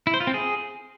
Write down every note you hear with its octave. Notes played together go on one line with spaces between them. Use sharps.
E4
C5
F4
C4
G#4